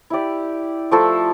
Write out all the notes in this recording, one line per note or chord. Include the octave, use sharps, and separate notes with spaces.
E4 G4 D5
F3 A3 E4 A4